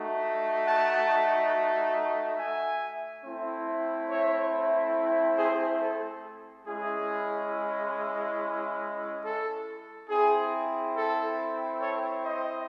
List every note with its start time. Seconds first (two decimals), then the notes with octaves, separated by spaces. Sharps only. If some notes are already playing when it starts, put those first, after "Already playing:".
Already playing: A3 D#4 F#4
0.66 F#5 A5
2.37 E5 G#5
3.23 A3 C4 E4
4.09 C#5 E5
5.38 G#4 C5
5.80 A4
6.66 G#3 C#4 E4 G#4
9.23 A4
10.09 C4 E4 G#4
10.94 A4
11.80 A4 C#5
12.23 C5 D#5